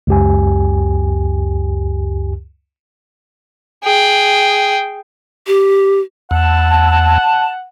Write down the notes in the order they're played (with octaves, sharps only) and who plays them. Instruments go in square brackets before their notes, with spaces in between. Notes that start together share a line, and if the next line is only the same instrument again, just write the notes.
[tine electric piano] C#2 F#2 G4 G#5
[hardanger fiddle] G#4 G5
[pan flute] G4
[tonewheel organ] E2 [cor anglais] F#5 [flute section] A5